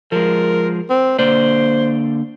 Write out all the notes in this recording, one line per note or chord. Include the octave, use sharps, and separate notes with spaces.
F3 G#3 A#4
C4
D3 A#3 C5 D5